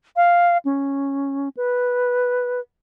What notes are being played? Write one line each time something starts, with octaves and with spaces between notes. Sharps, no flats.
F5
C#4
B4